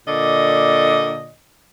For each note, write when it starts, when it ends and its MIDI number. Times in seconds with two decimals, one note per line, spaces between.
0.08 1.32 46
0.08 1.32 50
0.08 1.32 74
0.08 1.32 75